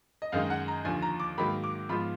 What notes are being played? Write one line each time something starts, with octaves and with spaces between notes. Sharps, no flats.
D#5
F#2 D#3 G#3 D#4 F5
F#5
A#5
D#2 D3 F3 G#5
A#5
D6
G#2 D#3 F#3 A#3 B5
D6
G#2 F3 B3 F4 B5